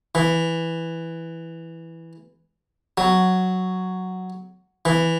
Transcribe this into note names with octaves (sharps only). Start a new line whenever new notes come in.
E3
F#3
E3